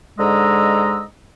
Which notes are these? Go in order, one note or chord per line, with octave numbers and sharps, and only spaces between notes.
G#2 D3 G#3 D#5 A#5 E6